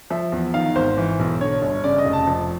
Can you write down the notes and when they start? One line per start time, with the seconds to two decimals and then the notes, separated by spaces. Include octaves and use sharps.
0.11 F3 E5
0.32 E2
0.54 D#3 F5
0.76 G#1 C5
0.97 E3
1.19 B1
1.41 D3 C#5
1.62 G1
1.84 C#3 D5
1.98 D#5
2.05 F1
2.13 A5
2.27 F3